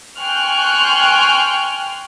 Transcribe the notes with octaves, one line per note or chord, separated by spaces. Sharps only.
G5 G#5 C6 C#6 F6 F#6